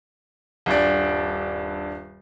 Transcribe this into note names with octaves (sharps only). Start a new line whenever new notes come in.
D#1 G2 D5